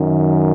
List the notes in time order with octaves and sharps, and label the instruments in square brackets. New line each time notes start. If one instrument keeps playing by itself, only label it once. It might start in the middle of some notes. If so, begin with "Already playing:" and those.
Already playing: [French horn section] F#2 D#3